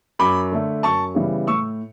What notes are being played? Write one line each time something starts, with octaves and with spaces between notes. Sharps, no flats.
F#2 B5 D6
D3 A3
F#2 A5 C#6
C#3 E3 G3 B3
A2 C#6 E6